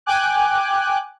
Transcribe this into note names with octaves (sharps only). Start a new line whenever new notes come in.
G5 G#5 D6 F#6